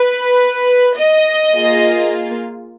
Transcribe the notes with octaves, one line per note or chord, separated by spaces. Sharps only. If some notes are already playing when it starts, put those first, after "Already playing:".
Already playing: B4
D#5
A#3 F4 G#4